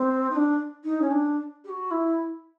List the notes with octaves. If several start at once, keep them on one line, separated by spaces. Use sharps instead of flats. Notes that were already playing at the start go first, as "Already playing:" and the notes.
Already playing: C4
D#4
D4
D#4
C#4
D4
G4
F#4
E4